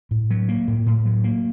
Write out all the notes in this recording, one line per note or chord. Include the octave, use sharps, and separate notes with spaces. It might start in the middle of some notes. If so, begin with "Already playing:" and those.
A2
F#3
A#3
A2
A2
F#3
A#3